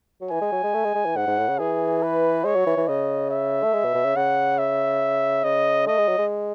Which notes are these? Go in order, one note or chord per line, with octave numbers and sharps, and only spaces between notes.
F#3
E3 G#5
G#3
F#3
G#3
A3
G#3
G#3
E3
G#2 F#5
G#2
A2
C#3
E3 G#4
B4
G#3 C#5
F#3
E3
E3
C#3 D#5
E5
A3
G#3
B2
B2
C#3
C#3 F#5
E5
C#3 D#5
A3 D#5
G#3
F#3
G#3